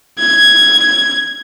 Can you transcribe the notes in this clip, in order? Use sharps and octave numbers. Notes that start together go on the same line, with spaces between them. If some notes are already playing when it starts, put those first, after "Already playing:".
G#6